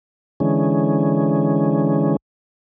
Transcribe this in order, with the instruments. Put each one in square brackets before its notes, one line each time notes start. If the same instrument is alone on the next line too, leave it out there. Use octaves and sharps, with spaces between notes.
[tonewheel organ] D3 E3 G#3 C#4